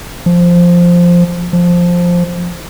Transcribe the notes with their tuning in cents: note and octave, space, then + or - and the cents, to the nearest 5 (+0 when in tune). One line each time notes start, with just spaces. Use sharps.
F3 +0
F3 +5